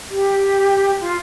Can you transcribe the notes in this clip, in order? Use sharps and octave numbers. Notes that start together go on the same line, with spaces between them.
G4
F4